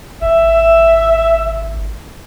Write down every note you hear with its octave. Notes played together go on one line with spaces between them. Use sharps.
G#1 E5